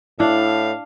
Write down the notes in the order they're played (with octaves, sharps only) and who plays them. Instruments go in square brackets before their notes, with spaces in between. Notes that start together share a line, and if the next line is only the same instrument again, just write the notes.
[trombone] A2 [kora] D4 [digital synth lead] E4 [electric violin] F5